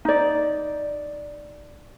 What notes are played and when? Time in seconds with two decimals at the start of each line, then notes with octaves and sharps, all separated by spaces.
0.05 D#4 D5